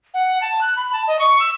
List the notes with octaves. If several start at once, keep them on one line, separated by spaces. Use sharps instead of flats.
F#5
A5
F#6
B5
A5
D#5
C#6
E6